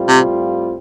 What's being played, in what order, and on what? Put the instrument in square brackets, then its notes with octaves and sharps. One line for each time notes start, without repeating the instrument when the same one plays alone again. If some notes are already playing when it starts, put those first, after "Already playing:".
Already playing: [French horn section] A2 G3 C4 F4
[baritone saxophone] C3